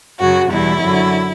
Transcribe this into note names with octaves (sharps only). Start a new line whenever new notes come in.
F#2 C#3 F#3 F#4
E2 B2 G3 E4
F#2 D3 F#3